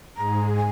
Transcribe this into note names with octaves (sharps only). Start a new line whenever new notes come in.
G#2 G#3 A#5
G#5